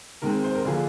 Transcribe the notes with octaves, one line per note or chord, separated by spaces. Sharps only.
D#3 G#3 C4 A#4
C5
A#4
D3 F3 A#3 G#4